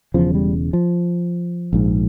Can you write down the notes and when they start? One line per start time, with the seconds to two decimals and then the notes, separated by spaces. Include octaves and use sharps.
0.14 E1 E2 C#3 F3
0.35 G3
0.73 F3
1.73 A#1 G#2